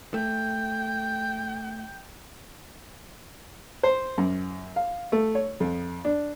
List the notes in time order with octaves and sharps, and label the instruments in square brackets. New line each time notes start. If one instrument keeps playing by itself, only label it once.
[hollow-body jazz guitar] A3 [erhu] G5
[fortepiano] C5
F#2
F5
A3
C#5
F2
D4